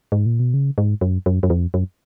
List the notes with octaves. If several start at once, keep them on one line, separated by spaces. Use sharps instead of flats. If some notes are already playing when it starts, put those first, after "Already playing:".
G#2
A#2
B2
C#3
G#2
F#2
F#2
F#2
F2
F#2